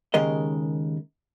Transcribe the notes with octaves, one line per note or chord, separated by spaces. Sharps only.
D#2 C#3 G#3 A#4 D#5